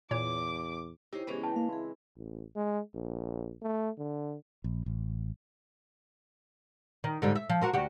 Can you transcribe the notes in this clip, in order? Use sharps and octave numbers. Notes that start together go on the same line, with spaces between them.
E2 A#2 C#5 D6
C#3 D#4 E4 G4 C5
C#3 E3 G#3 B3 C#4 G#4
G5 A5
A#3 F5
C4 E4 G#4
A1
G#3
A#1
A3
D3
A#1
A1
D#3
G#2 D3 G3
E5
F3
F#4 A#4 C5
D2 F#4 G4